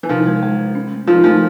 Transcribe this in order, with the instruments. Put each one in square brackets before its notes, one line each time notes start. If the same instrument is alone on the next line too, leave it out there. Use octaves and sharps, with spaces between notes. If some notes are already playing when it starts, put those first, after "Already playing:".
[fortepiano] E3
[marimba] C3 [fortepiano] D#3 F3
[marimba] G#3
G#3
G#3
C#4
A3
[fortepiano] D#3 F3 [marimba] F4
[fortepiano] D#3 F3 [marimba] A3